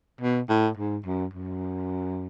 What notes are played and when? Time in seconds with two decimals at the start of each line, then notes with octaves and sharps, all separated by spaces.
0.21 B2
0.49 A2
0.77 G#2
1.06 F#2
1.34 F#2